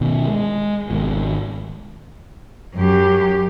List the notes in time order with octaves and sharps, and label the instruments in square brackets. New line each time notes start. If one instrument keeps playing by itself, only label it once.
[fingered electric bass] B2 D#3
G#3
G#1 B2
[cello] F#2 G4